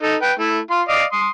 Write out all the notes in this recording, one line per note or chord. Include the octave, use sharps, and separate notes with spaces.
D#4 A4
B4 G5
A3 E4
F4 C6
D5 D#5 F5
C6 D#6